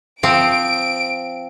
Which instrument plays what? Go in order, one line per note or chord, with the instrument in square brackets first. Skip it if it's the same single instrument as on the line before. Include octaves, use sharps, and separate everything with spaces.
[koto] F3 C4 [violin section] D7